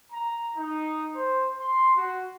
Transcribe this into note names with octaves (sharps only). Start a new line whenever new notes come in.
A#5
D#4
C5
C6
F#4